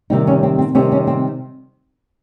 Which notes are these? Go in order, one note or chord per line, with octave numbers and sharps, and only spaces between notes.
C3 D#3 G3 C4 D#4
C#4
C4
C4
C3 D#3 G3 C4 C#4
C#4
C4